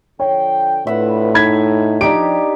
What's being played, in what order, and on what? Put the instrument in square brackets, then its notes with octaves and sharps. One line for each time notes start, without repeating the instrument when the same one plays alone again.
[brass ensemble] D3 F3 G5 [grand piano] C#5
[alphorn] A2 [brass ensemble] D4 F4 B4 [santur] E5 F#5
[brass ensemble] D#4 [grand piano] B5 G#6 B6
[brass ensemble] F3 [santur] D4 D#4 G4 [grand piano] D7